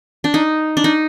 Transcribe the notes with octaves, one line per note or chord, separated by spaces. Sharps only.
D4
D#4
D4
D#4